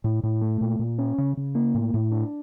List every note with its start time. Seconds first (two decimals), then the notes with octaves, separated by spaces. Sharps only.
0.04 A2
0.23 A2
0.42 A3
0.61 A#2
0.79 A#2
0.98 C#4
1.18 C#3
1.37 C#3
1.55 A#3
1.74 A2
1.94 A2
2.12 D4